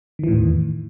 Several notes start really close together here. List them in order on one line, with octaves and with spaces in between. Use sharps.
D#3 E3 A2 E2